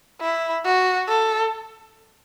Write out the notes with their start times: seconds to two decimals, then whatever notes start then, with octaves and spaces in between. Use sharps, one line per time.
0.21 E4
0.65 F#4
1.08 A4